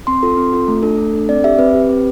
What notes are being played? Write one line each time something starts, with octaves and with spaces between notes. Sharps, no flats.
C4 C6
F4 A4
C4
F4 A4
A3
D4 A4
A3
D4 A4
C4 D5
G4 E5
C4 B4
G4
C4